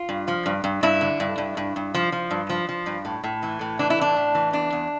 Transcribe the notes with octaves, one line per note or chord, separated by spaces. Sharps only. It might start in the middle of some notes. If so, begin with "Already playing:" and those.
Already playing: F4
G2
F3
G2
G2
G2 E4
D3
G2
G2
G2
G2
F3
F3
G2
F3
F3
G2
A2
A2
E3
A2
E3 D4
E4
A2 D4
A2
E3
E2 D4
E2